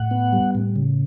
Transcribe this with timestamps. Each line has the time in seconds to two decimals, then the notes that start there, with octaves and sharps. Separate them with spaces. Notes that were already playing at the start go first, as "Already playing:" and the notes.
Already playing: A2 F#5
0.11 B3
0.33 G3
0.55 A2
0.76 C#3